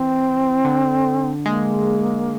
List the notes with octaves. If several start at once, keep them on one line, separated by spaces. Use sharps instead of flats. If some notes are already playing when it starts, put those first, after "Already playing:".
Already playing: E3 C4
D3
G#3 A#3